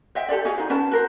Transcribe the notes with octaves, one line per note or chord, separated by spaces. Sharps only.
C5 D#5 E5 G5
G4 A4 C5 D5
F#4 G#4 D#5 F5
D#4 C5
C#4 B4 A5
F#4 A#4 C5